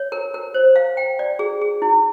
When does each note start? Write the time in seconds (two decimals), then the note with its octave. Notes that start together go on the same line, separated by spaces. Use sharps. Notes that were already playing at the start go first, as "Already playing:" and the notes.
Already playing: C#5
0.12 A#4
0.34 A#4
0.54 C5
0.76 F5
0.97 G5
1.19 D5
1.39 G#4
1.61 G#4
1.82 E4